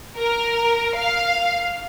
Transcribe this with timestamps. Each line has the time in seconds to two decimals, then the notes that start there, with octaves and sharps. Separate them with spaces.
0.17 A#4
0.95 F5